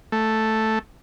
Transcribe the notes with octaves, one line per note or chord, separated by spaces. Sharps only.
A3